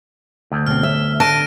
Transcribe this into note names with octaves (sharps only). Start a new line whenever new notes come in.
D2
B2 C4 F6
E5
D3 A5 A#6 D7 D#7